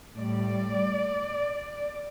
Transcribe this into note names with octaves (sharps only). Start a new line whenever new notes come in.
A2 G3 D5